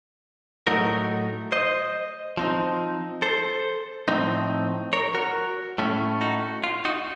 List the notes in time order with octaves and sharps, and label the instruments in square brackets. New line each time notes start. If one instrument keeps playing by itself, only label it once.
[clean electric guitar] A2 F#3 A3 D#4 F#4 A#4
C5 D#5
F3 C4 D#4
A4 C5
A2 F3 C4 D#4
A#4 C#5
F#4 A#4
A2 A3 C#4
D#4 F#4
F4
D#4 F#4